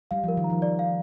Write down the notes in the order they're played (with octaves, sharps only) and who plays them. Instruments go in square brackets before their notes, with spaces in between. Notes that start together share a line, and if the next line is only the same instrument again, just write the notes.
[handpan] G3 [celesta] F5
[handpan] F3 [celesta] A#4
[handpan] D#3
[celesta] A#5
[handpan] F3
[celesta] D5
F5